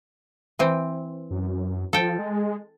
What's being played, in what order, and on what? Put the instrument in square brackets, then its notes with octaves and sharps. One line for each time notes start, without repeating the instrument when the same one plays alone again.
[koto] E3 C4
[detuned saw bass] F#2
[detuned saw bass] F3 [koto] A4 G5
[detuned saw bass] G#3